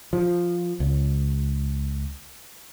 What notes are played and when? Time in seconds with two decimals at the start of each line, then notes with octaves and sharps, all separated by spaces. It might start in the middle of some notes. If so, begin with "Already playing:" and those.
0.13 F3
0.80 C#2